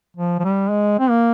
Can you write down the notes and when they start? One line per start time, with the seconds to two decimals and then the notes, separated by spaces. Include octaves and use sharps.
0.17 F3
0.39 F3
0.44 G3
0.70 G#3
0.99 C4
1.10 A#3